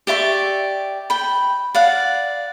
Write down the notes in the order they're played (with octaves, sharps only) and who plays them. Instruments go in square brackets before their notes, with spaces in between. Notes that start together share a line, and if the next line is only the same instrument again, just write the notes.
[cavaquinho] G4 D5 E5 C#6
G5 B5
D5 F5 F#5